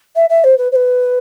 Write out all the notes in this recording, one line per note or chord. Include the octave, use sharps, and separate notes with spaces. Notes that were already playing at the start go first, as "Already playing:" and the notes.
E5
E5
C5
B4
C5
B4